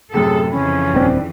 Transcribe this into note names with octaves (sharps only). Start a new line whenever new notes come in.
F#2 A2 C3 G#4 A4
F2 C#3 E3 C#4 B5
D#1 D#3 C4 D4 E4